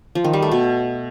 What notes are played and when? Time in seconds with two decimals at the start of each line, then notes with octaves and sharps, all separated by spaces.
0.15 F3
0.24 D#3
0.33 G3
0.42 A3
0.52 B2